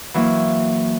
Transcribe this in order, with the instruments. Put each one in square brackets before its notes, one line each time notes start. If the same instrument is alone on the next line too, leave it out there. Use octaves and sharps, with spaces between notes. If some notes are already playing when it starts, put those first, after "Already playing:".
[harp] E3 F#3 A#3